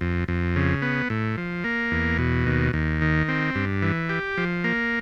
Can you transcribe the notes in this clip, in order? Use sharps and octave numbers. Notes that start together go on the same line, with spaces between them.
F2
F2
C#3
B3
A2
F3
A#3
E2
B2
D#2
D#2
D#3
C4
G2
E3
G4
F3
A#3